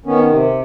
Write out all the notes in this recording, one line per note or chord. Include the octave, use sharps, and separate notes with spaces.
D#3 B3 C#4
C3